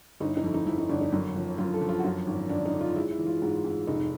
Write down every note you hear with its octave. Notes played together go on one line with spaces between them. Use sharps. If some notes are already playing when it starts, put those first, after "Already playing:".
G1 D#4
E4
D#4
F2 E4
D#4
F2 E4
D#4
G1 D4
D#4
F#2
F3
F#2 F4
A4
F3
F4
F#4
F#2 F4
G#1
G#1 D4
D#4
D3
F4
G#3 E4
E4
E3
F4
G#2
G#2
F1 D#4